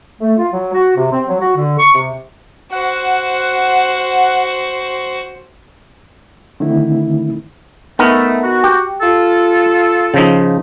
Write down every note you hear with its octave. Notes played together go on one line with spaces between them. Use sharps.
A3
F4
F#3
F#4
C3
C4
F#3
F#4
D3
C#6
C3
F#4 C5 F#5
D3 D#3 A3 C4 D#4 E4
A3 B3 D#4 A#4
F#4
G4
F4 A4
C#3 F3 D#4